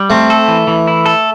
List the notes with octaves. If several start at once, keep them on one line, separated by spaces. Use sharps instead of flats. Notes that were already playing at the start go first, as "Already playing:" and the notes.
Already playing: G3
A3 C4
A4
E3
E3
E4
A4